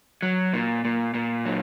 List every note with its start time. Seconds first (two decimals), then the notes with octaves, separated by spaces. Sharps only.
0.22 F#3
0.53 A#2
0.85 A#2
1.14 A#2
1.45 F#3